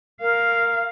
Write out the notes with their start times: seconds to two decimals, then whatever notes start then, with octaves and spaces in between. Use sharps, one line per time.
0.21 A#4 F5